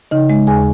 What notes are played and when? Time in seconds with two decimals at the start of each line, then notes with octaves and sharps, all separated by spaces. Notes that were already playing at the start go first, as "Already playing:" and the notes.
0.11 C#3 D#4 D#5
0.30 G#3
0.47 D#2 G#4 G#5